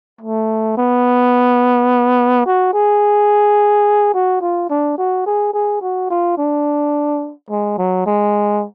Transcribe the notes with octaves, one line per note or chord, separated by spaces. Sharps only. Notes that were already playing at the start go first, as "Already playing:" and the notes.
A3
B3
F#4
G#4
F#4
F4
D4
F#4
G#4
G#4
F#4
F4
D4
G#3
F#3
G#3